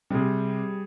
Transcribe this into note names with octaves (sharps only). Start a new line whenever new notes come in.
C3 G3 G#4